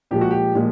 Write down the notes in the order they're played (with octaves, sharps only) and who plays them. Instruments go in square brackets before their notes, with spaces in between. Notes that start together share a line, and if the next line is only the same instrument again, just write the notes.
[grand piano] A#2 F3 G#3 G4
F#4
G4
A#2 F3 G#3